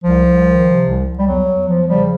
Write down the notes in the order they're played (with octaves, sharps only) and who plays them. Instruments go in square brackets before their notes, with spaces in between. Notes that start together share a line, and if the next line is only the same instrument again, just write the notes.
[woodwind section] C2 F3
C2
D#3
C3
C2
C2
G3
E2 F#3
E2
F3
C#3 F3 G3